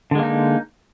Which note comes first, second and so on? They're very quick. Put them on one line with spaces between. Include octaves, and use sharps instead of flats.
D3 G#3 A#3 D#4